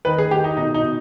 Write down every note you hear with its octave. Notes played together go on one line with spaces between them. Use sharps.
D#3 B4
G#4
D#3 G4
D#4
B2 D#4
D#4
B2